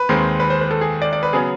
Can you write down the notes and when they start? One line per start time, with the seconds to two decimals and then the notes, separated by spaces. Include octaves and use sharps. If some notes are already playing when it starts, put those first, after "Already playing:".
Already playing: B4
0.09 D#2 D#3 G#3 C4
0.40 B4
0.50 C5
0.61 B4
0.71 A4
0.81 G#4
1.02 D5
1.13 D5
1.23 B4
1.33 C#3 F#3 B3 G#4